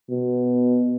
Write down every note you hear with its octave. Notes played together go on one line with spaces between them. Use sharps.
B2